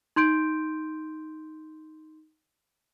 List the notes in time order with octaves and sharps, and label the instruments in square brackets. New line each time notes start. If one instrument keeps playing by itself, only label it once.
[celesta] D#4 C6 G6 D7